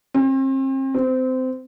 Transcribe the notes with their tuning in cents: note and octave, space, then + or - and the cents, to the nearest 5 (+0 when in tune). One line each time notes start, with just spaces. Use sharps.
C4 +40
C4 -20